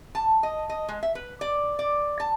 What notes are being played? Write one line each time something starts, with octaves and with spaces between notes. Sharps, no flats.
A5
D#5
D#5
G#3
E5
B4
D5
D5
A5